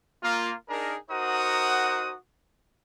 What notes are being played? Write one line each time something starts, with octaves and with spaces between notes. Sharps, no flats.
A#3 F4
D4 D#4 G#4 A#4
D#4 F#4 A#4 C5 F#5 D#6